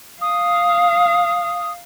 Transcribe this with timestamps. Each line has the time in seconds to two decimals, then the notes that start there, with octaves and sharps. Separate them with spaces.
0.21 F5 D#6